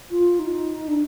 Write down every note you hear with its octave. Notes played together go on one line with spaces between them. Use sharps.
F4
D#4
D4